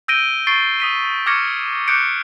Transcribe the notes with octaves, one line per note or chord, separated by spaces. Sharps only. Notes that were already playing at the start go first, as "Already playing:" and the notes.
E6 G6 A#6 D7 D#7 G7
C#6 A6 C7 D7 G7
D#6 B6 D#7
C#6 D6 F6 G#6 A#6 C#7
D6 F#6 G6 C#7 D7